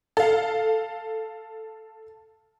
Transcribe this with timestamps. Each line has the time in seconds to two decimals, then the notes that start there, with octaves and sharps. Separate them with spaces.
0.17 A4 F5